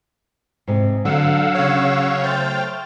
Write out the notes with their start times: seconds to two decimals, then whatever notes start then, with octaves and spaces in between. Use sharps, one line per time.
0.67 G#2 C3
1.05 D3 F#3 F5 F#5 E6
1.55 C#3 C#5
2.24 A3 C5 G5 F6 A6